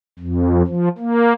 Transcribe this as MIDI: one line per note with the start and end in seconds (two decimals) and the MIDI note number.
0.19 0.62 41
0.67 0.88 53
0.98 1.33 58